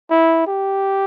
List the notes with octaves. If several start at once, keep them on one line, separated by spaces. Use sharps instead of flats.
E4
G4